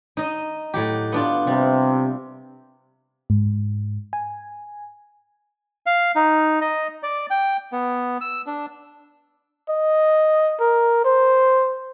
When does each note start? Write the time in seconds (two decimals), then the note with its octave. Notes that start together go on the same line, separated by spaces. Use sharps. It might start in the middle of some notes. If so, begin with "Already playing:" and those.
0.17 D#4 D#5
0.74 A2 F#3 G4
1.12 B3 D4 F4
1.47 C3 G3
3.30 G#2
4.13 G#5
5.86 F5
6.16 D#4
6.61 D#5
7.03 D5
7.30 G5
7.72 B3
8.21 E6
8.47 D4
9.69 D#5
10.60 A#4
11.05 C5